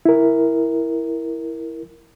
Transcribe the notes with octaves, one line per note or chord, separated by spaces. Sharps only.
E4 A#4